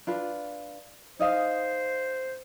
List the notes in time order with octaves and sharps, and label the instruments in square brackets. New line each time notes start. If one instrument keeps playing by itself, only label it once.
[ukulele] D4 F4 B4
[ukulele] D#4 D#5 F5 [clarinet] C5